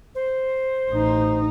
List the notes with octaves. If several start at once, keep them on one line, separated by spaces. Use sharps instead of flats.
C5
A1 D#4